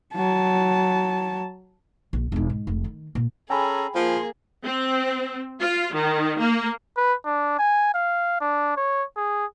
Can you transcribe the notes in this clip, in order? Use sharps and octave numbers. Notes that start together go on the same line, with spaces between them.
F#3 A5
A#1
E1 D#4
G#2
F1 C#2
D#3
A#2
C#4 G#4 A4 G5 G#5 A#5 B5
F3 A#3 G#4 C6
C4
F4
D#3
A#3
B4
D4
G#5
F5
D4
C#5
G#4